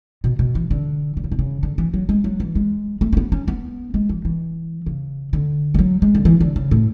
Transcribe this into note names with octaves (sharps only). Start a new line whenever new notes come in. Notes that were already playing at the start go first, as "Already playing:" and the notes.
B2
B2
E3
D3
D3
C#3
B2
C#3
D3
E3
F#3
G#3
F#3
E3
G#3
A3
C#4
B3
C#4
B3
G#3
E3
E3
C#3
D3
G#3
F#3
G#3
D3
E3
D3
C#3
A2